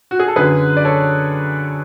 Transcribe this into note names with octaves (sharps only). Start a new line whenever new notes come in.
F#4
G#4
A4
F#2 D3 F#3 G#4 B4
D5
A4 C#5